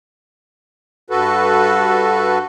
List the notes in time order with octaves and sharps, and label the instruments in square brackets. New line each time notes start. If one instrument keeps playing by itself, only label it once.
[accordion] G2 F#4 A4 B4